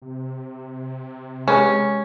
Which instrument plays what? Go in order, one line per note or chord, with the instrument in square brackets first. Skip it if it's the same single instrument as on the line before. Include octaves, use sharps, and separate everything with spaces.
[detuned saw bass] C3
[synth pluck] G#3 G4 [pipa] C#4 [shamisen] G#4 B4